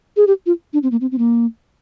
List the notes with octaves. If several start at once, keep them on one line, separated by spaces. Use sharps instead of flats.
G#4
G4
F4
D4
C4
A#3
C4
C4
A#3